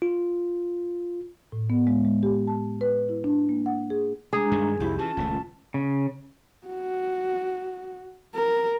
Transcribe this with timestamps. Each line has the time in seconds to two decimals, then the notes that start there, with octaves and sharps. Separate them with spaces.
0.02 F4
1.52 A2
1.70 B3
1.87 G#3
2.05 G#3
2.23 G4
2.47 A5
2.81 B4
3.09 E4
3.24 D4
3.49 A#3
3.66 F#5
3.90 G#4
4.33 G#3 D4 G#4 A#5
4.52 G2 D#3
4.80 C2 F2 E4 G4
4.99 E3 C#4 F4 A5
5.17 D#1 C#2 A3
5.74 C#3
6.67 F#4
8.35 A#4